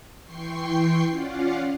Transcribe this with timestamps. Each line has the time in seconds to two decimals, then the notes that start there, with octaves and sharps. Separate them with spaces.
0.23 E3 G5 C6 C#6 C7
1.10 C#4 F4 D5 F5 F#5